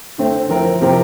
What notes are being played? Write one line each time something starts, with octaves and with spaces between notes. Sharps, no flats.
D3 A3 C4
F3 C4 E4 A#4
C3 F3 C4 G4 A#4